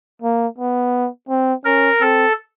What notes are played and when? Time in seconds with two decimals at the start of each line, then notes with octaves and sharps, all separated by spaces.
0.22 A#3
0.58 B3
1.29 C4
1.65 C#4 A#4
2.01 C4 A4